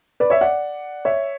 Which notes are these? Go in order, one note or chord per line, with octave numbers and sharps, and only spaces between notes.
B4 D5
C#5 E5
D5 F#5
C#5 E5